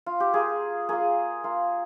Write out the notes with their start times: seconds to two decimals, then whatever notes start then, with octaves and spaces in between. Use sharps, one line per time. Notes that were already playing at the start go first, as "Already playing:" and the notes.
0.06 F4
0.20 G4
0.34 A#3 F4 G#4
0.89 A#3 F4 G#4
1.44 A#3 F4